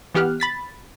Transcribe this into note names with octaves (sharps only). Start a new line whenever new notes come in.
E3 B3 G4 F6 F#6
B5 A6 B6